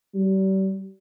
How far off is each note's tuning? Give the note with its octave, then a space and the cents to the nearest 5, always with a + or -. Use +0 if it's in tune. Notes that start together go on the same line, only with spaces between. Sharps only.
G3 -40